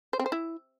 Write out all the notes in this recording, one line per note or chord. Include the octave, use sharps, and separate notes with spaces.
C5
C4
C5
E4